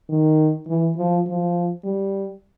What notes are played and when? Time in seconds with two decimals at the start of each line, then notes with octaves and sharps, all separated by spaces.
0.09 D#3
0.67 E3
0.97 F3
1.27 F3
1.84 G3